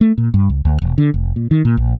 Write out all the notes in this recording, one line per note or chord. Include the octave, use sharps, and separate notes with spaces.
A3
A#2
G2
C#2
D2
E1
D3
F1
A#2
D#3
A#2
A#1